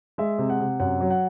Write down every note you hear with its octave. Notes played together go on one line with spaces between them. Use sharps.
G#3 E5
C3
F#5
C3
F#2 F#5
F#3
F#5